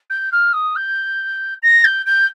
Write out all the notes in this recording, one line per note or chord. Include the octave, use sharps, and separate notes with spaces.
G6
F6
D#6
G6
A#6
G6
G6